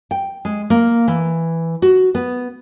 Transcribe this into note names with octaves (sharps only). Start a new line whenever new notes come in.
G5
G#3
A#3
E3
F#4
B3